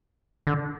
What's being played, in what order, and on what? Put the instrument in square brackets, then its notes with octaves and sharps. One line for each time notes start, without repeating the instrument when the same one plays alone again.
[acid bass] D3